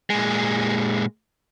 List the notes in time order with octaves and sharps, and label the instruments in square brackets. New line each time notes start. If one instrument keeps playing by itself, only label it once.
[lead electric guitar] A#2 G#3